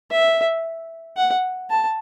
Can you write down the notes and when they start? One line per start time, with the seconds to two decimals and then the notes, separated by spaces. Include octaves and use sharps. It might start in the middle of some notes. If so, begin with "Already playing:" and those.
0.11 E5
1.17 F#5
1.70 A5